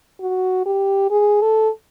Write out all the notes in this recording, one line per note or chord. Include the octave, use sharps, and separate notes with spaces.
F#4
G4
G#4
A4